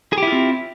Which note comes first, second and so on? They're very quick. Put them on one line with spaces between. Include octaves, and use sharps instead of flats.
G#4 G4 E4 F4 C4